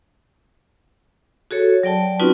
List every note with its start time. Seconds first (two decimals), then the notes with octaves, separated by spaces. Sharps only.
1.51 F#4 G#4 A4 C#5
1.83 F#3 D5 G5 A5
2.19 C4 C#4 D#4 F4 F#4 B4